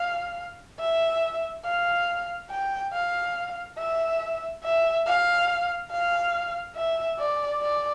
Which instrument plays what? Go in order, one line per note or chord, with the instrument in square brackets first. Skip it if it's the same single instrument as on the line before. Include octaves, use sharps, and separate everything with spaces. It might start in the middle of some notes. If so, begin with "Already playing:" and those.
Already playing: [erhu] F5
E5
F5
G5
F5
E5
E5
F5
F5
E5
D5
D5